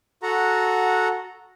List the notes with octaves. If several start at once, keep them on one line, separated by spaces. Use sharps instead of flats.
F#4 A4 F#5 A#5